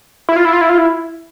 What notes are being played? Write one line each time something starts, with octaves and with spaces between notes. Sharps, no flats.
E4
F4
E4
F4
E4
F4
E4